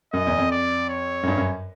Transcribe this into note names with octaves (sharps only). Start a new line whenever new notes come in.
F#2 D#5
E2
F2
D5
C#5
F#2
G2
F#2